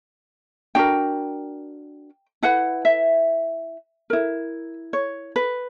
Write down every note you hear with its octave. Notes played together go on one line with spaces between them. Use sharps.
D4 F#4 A#4 G5
E4 B4 F#5
E5
E4 A#4
C#5
B4